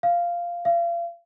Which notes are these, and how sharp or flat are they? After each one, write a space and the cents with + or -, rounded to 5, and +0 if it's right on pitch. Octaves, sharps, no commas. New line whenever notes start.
F5 -10
F5 -35